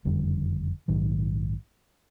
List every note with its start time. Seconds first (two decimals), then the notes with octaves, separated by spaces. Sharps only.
0.05 F#1 F2 D3 G3
0.88 A#1 G#2 D#3 F#3